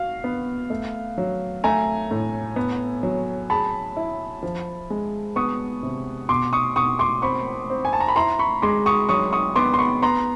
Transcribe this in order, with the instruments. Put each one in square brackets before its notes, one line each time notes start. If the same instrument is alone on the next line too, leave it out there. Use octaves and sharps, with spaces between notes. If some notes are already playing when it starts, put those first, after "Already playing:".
Already playing: [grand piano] F#4 [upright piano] F5
[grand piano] B3
A3
F#3
[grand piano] A3 [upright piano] G#5 A#5
[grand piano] A2
B3
F#3
[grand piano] G#4 [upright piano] A5 B5
[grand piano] E4
F3
G#3
[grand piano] B3 [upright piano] C#6 D#6
[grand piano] C3
[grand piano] B2 [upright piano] C6 D6
[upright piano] C#6 D#6
[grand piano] B2 [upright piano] C#6 D#6
[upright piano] C6 D6
[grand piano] C4 [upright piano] B5 C#6
[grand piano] C4
[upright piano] G#5
A5
A#5
B5
[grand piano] E4 [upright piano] A#5 C6
[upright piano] B5 C#6
[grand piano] G#3 [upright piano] C6 D6
[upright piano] C#6 D#6
[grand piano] F#3 [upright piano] C#6 D#6
[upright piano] C#6 D#6
[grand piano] B3 [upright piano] C6 D6
[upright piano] C6
B5 C#6
[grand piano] B3 [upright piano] A#5 C6